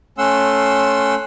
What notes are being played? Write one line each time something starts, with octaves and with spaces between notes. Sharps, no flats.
A3 C#4 F#5 C6 E6